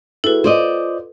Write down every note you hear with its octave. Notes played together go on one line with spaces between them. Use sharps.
E4 F#4 G#4 A4 B4
F4 C5 D5 D#5